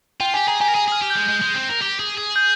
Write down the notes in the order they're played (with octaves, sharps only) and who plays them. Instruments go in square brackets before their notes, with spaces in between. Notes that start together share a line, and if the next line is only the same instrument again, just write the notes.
[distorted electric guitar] F4 [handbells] G5
[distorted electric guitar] G4 [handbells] G#5
[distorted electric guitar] G#4 [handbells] A#5
[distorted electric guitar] G4 [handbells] G#5
[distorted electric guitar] A#4
[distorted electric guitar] G#4 [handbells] G#5
[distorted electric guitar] G#4 [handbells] F6
[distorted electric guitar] G4
[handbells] G6
[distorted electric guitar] G#3
[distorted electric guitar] G#3 [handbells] G6
[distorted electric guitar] G#3
C4
A#4
G4
G#4
G#4
[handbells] G6